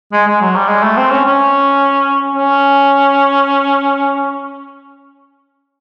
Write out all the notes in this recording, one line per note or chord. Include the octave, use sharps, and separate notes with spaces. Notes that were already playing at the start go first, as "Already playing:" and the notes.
G#3
G#3
F#3
G3
G#3
A3
C4
C#4
C#4
C#4